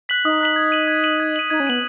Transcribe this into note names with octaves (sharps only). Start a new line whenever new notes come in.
F#6 B6 F#7
D#4 D#6
F#6 B6 F#7
G#6
D#7 F#7
G#6
D#7 F#7
G#6
D#7 F#7
D#4 G#6
C#4
B3 D#7 F#7